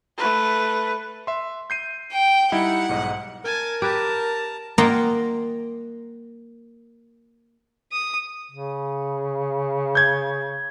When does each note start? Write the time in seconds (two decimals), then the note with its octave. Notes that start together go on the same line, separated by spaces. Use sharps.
0.18 A3 B4
1.27 E5 C6
1.70 G6 C7 D#7
2.13 G5
2.52 G3 D#4 E4 F#5
2.89 B1 G#2 D#5
3.45 A#4 G#5 A5
3.82 G4 B4 A5 A#5
4.78 A#3 F4 D#5 F#5 G5 A#5
7.92 D#6
8.51 C#3
9.95 G6 G#6